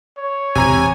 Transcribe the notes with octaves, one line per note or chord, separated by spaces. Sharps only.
C#5
E1 A2 C3 G#5 A#5